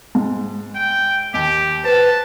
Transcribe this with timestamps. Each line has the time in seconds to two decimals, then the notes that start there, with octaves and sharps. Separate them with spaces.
0.15 G#2
0.75 G5
1.34 D#2 G4
1.84 B4 C5 A5